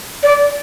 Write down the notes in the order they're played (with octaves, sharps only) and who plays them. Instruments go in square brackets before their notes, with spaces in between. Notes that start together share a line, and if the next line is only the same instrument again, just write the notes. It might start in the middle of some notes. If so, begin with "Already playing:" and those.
[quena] D5